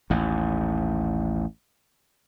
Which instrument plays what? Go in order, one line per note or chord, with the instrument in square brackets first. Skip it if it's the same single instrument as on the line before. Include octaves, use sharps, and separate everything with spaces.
[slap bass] A1 D#2